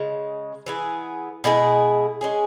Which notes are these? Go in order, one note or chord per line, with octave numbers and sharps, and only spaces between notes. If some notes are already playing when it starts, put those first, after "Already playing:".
Already playing: C#3 G#3
E3 B3 G#4
B2 G#3 E4 G#4
G#3 C#4 G#4